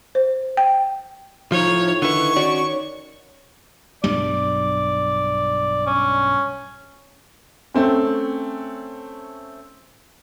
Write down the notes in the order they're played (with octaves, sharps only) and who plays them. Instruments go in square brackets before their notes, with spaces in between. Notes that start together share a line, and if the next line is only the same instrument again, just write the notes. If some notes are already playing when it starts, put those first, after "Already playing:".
[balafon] C5
G5
[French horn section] A2 [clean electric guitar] F3 [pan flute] D#4 [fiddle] C#5
[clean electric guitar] D3 E4 [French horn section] D#3 [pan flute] B4 [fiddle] C#6
[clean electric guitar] C#4 F#4 D5 [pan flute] C#5
[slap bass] B1 G2 G3 [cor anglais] D5
[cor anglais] C#4
[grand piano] A3 C4 C#4